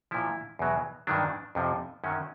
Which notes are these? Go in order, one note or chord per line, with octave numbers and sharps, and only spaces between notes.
A#2 F3 E4
E2 B2 F#3
G2 D#3 F#3 D4
F2 C3 F3
F#2 D#3 F#3 C#4